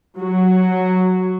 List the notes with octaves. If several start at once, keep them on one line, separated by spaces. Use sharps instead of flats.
F#3 F#4